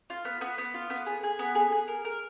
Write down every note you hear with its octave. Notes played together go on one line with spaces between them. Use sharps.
F4
B3
B3
B3
F4
B3
G#4
G#4
B3
G#4
G#4
A#4
A#4